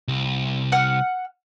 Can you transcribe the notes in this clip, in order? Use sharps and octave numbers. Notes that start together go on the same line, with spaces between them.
C2
F#5 F6